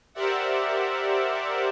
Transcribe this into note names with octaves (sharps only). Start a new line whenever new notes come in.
G4 A#4 C5 D5 E5 F#5